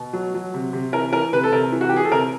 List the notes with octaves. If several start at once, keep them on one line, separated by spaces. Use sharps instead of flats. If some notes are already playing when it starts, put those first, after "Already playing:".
Already playing: B2
F#3
F#3
C3
C3
E3 A#4
E3 A#4
C3 B4
A4
C3 A#4
E3
F#4
G4
E3 G#4
A4
C3 A#4